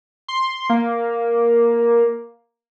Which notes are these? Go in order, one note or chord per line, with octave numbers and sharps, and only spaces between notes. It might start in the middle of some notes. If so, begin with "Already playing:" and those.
C6
A#3